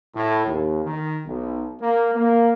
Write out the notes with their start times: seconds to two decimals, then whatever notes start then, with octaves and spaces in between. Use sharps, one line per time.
0.15 A2
0.46 D#2
0.85 D#3
1.26 B1
1.81 A#3
2.15 A#3